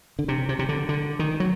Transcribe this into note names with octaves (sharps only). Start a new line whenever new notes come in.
D3
C3
C3
C3
D3
D3
D#3
F#3